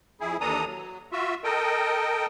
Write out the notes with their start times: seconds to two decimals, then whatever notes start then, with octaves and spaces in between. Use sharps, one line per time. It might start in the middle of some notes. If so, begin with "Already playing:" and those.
0.20 F2 E4 G#4
0.41 D#2 E3 D4 A4 A#5 D#6
0.66 F#3
1.12 F4 F#4 E5
1.44 A4 A#4 D#5 G5